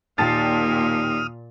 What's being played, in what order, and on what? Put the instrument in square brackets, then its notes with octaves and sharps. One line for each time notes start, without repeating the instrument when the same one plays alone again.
[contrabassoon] D#2 [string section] A#2 [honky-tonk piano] G5 A5 A6 [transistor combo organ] D#6 F6